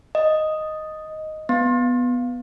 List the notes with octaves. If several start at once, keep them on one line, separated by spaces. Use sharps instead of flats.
D#5
B3